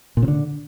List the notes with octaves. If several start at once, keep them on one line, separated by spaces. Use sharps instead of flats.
A#2
C#3
D3